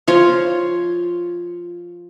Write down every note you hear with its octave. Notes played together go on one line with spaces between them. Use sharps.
F3 F4 C#5